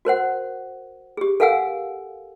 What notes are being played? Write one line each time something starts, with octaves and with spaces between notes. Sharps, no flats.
F#4 A#4 C5 F#5
G4 G#4
A4 A#4 F5 F#5 G#5 E6